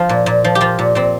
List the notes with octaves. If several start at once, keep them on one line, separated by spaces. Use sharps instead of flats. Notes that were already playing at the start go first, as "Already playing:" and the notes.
Already playing: F3 F4
A#2
A#2
F3
G4
F3 F4
A#2
A#2 C4